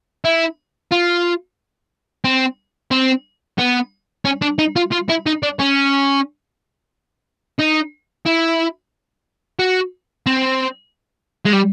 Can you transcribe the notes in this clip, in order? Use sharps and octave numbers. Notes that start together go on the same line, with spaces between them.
E4
F4
C4
C4
B3
C#4
D4
D#4
F4
F4
E4
D#4
D4
C#4
D#4
E4
F#4
C4
G#3
G3